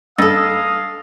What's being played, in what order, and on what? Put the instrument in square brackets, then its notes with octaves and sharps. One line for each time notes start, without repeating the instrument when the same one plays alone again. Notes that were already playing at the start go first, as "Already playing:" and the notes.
[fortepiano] G2 [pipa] D#4 A4 [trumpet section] F5 D#6 [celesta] E6 A6 A#6